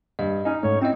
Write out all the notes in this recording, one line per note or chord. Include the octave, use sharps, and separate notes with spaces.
G2 D#5
C#4 D#4
G#2 A3 C#5
C4 C#4 E4 D#5